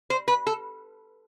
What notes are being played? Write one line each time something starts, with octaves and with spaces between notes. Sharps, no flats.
C5
B4
A4